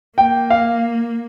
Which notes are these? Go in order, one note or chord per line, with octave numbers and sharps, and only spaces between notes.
A#3 G5
F5